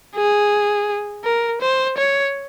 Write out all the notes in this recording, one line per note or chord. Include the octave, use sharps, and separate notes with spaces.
G#4
A#4
C5
C#5